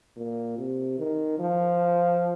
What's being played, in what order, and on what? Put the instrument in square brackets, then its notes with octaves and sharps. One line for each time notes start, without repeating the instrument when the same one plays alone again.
[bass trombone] A#2
C3
D#3
F3